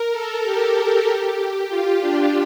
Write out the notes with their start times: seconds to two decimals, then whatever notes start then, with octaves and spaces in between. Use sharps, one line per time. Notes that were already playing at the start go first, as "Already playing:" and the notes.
Already playing: A#4
0.12 A4
0.43 G4
1.69 F4
2.00 D4